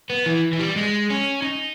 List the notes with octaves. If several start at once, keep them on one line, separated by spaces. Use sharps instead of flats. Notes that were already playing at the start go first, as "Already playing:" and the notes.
B3
E3
E3
G3
G#3
C#4
D#4